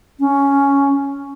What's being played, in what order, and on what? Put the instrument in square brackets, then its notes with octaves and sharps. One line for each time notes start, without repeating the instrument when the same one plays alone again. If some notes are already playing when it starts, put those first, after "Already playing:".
[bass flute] C#4